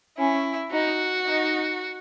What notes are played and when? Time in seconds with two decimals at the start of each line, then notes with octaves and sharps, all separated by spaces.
0.18 C#4 E4
0.72 D#4 F#4
1.26 D#4